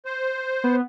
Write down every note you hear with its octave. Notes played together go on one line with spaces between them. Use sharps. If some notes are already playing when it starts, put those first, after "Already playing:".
C5
B3